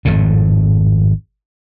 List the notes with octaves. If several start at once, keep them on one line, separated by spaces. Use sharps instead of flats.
G#1 F2 A2